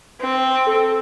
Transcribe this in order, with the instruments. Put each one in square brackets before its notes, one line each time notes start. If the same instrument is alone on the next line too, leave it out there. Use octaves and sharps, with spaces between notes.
[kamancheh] C4
[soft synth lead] A4